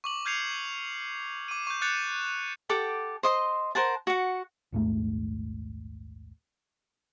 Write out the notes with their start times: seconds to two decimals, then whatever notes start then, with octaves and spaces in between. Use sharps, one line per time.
0.04 C#6 D6 F#7
0.25 F6 G6 G#6 C7 C#7 F7
1.48 D6 D#7
1.67 C#6 G6
1.81 D6 F#6 G6 A6 C#7 F7
2.69 G4 A4 F#5 D6
3.23 C5 D#5 C6
3.75 A#4 C5 F#5 A5
4.07 F#4 F#5
4.72 A#1 D#2 G#2 A3